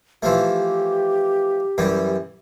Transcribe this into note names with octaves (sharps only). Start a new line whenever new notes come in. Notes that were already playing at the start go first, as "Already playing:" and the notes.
E3 F3 A3 G4
F#2 E3 G3